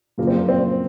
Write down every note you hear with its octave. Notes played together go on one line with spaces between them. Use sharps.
F#2 C#3 F3 A#3
C4
A#3
C4